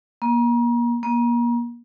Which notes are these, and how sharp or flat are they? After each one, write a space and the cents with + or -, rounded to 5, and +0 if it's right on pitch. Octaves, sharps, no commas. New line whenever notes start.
A#3 +35
A#3 +35